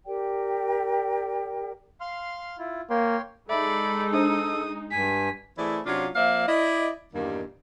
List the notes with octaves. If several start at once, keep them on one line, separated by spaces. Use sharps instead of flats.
G4 A#4 D5 G5
F5 C6 F6
E4 F4
A#3 C#5 G5 C6
G#3 D#4 A4 D5 E5 B5
D4 C5 D#5 D#6
G2 G#5 B6
E3 A3 C4 E4 G#4 D5
C3 F#3 C#4 D4 F4
F3 A#3 C4 D5 E5 F5
E4 D5 D#5
E2 G2 A#2 D#3 G3 A#3